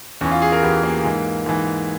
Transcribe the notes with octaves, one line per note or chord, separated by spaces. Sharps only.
E2 E3 C#4
F4
G#4
A#4
E2 E3 G4
A#3
G#2 E3
G#2 E3